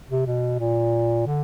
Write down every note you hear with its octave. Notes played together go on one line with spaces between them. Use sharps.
C3
B2
A#2
D3